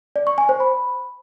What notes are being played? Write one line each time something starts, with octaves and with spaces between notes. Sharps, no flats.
D5
C#6
G#5
C5
B5